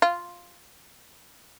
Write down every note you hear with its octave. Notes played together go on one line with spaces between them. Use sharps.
F4